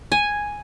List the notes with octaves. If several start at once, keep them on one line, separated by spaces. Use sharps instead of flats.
G#5